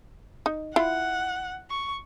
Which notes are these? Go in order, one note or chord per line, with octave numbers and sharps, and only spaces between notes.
D#4
E4 F4 F#5
C#6